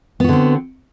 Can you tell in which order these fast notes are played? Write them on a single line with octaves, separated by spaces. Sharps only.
B3 F#4 D3 C4